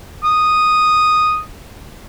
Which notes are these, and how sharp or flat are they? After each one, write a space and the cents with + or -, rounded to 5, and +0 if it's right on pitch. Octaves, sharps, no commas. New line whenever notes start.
D#6 -5